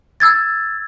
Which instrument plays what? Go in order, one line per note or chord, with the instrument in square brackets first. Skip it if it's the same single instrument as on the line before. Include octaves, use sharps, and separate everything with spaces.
[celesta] E6 G#6 A6